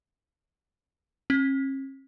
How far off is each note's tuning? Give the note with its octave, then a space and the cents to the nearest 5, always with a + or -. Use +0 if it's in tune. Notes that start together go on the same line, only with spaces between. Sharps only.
C#4 -45